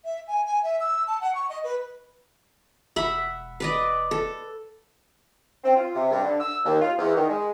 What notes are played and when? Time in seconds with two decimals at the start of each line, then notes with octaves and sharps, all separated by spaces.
0.05 E5
0.28 G#5
0.46 G#5
0.63 E5
0.80 E6
1.07 A5
1.21 F#5
1.35 C#6
1.49 D#5
1.64 B4
2.96 E1 E5 F#5 B5
3.60 B4 D5 D#5
4.11 A4
5.63 C4
5.76 F4
5.94 C3
6.11 G2
6.24 D3
6.39 E6
6.65 D#2
6.80 F4
6.98 E2
7.15 D#3
7.29 G#3